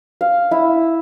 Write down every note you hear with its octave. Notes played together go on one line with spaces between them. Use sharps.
F5
E4